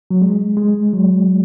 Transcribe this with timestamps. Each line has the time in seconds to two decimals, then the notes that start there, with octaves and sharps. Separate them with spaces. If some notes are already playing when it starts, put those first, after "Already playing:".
0.11 F#3
0.22 G#3
0.57 G#3
0.93 F#3